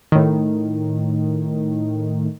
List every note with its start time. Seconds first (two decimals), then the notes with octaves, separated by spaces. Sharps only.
0.12 A2 D#3